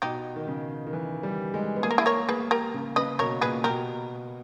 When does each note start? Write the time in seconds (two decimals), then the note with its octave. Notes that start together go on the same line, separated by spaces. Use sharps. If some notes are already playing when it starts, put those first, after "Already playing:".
0.02 B2 D#4 G4
0.36 D#3
0.47 C#3
0.87 D#3
0.93 E3
1.23 G3
1.54 G#3
1.76 B3
1.83 A#3 G#4
1.91 A#4
1.98 E4 G#4
2.06 A#4 C#5
2.29 A#3 G#4 B4
2.51 G4 A#4
2.74 C#3
2.96 C#3 B4 D#5
3.19 B2 A#4 C#5
3.41 A#2 G#4 B4
3.64 B2 G4 A#4